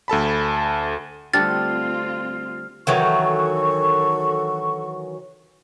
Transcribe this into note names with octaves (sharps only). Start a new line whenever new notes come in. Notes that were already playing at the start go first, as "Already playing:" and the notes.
D2 A4 A5 B5
D3 G3 A3 C4 F4 F6 A6
D#3 E3 F#3 A4 C#6